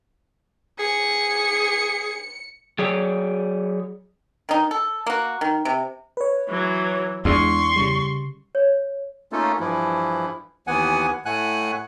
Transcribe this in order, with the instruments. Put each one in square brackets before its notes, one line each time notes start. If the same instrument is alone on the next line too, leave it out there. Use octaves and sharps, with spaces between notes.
[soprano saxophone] G#4 [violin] C#7
[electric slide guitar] F#3 G#4 C#5 D5
[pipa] D#3 D#4
A4
A#3 F#4
D#3
C3
[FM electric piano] B4 C#5
[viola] E3 F#3
[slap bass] E2 [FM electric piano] G#3 D4 [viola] C6 C#6
[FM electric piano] C#3 G3
[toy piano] C#5
[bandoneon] A3 A#3 C#4 D#4 F4 A4
G2 E3 F3 E4
D#2 E3 B3 F#5 G#5
A2 A3 F#5 G#5 F#6